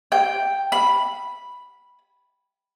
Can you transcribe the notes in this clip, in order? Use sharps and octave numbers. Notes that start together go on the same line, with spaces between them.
G5
B5